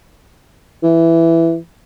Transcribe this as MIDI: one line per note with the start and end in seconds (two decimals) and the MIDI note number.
0.83 1.57 52